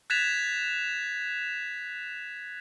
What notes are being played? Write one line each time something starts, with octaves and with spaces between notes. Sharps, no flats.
F#6 G#6 A6 B6 E7 F7